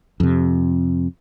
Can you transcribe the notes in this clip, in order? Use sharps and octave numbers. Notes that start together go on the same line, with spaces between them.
F2 C3